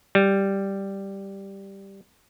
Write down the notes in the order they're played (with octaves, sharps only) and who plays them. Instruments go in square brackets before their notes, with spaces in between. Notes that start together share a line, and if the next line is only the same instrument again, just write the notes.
[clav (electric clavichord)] G3